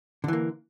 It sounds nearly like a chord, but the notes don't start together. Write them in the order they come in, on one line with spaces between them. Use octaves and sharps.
D3 E3 A#3